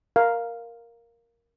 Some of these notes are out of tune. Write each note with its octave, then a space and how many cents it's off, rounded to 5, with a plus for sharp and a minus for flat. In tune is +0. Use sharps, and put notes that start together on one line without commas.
A#4 +0 F5 +0